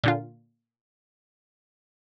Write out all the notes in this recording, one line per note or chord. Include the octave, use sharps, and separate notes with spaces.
A#2 D3 F4